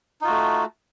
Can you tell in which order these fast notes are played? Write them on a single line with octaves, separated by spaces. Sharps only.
D#4 F4 F#4 A3